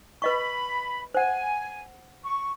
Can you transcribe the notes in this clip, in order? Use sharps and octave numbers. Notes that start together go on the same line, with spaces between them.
B4 D#5 B5 C#6
C5 F#5 G#5
C#6